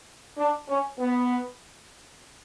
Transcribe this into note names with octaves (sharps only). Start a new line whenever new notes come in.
D4
C#4
B3